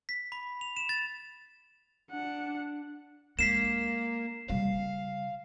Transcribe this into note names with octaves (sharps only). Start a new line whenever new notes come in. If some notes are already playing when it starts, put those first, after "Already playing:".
B6
B5
F7
E7
A6
D4 F#5
G#3 A#3 D4 B6 C7 E7
C#3 G3 F5